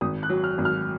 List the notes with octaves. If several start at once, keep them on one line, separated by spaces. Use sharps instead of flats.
G#1 D#6
F#6
F#3
F6
G#1
F6